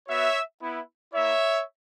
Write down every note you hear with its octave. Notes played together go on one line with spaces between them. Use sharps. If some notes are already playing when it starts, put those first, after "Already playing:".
B3 F#4 C#5 E5
B3 E4
A#3 E4 C#5 E5